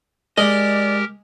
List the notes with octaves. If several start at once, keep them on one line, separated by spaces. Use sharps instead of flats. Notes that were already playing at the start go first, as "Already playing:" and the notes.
G#3 G4 A#4 D5 D#5